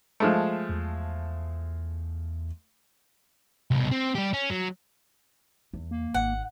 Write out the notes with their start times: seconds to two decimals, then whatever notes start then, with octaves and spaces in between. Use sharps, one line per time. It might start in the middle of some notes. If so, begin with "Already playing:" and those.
0.20 F3 G#3 A3
0.69 E2
3.71 C2 B2
3.91 C4
4.15 G3 G4
4.33 C#4
4.50 F#3
5.74 E2
5.91 A#3
6.14 G#1 F#5